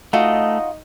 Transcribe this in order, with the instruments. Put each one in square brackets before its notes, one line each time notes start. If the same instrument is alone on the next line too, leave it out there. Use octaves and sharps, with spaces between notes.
[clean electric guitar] A3 [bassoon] D#4 [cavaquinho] F4 F#4 D#5